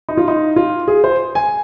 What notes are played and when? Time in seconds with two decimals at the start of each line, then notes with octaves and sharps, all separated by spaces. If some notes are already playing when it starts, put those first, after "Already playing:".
0.09 D#4
0.17 F4
0.28 D#4
0.56 F4
0.88 G#4
1.04 C5
1.35 G#5